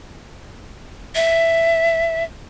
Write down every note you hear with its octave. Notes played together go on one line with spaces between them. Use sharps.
E5